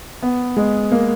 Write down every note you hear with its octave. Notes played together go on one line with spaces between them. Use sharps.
B3
G#3
A#3